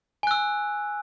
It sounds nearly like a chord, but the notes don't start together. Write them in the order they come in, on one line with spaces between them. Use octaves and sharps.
G#5 F#6 E6